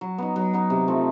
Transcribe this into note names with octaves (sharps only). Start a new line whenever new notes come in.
F#3
B3 D#4
F#3
B3 D#4
C3
F3 A3 C4